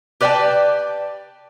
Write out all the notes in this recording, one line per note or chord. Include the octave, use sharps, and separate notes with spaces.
G4 B4 D5 F5 G5 A5